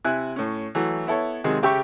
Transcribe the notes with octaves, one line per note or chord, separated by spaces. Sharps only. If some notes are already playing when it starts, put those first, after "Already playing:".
C3 E4 G#5 F#6
A2 C#4
E3 F#3 A3
B3 E4 A4 C#5
C3 D#3 F#3 G#3 G#4
C#3 G4 E5 G5 C#6